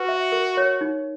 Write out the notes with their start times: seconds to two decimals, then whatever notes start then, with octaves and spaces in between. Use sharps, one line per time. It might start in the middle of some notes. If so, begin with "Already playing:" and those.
Already playing: F#4 B4
0.09 E5
0.32 A#4
0.57 C#5
0.81 D#4